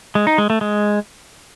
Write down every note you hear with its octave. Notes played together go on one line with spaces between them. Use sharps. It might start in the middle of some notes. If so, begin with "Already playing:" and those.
G#3
D#4
G#3
A3
G#3